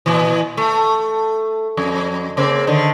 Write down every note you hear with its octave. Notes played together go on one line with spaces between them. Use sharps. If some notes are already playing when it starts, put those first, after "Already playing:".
A#2 E3
A3
F2
C#3 A#3 C4
D3 D#3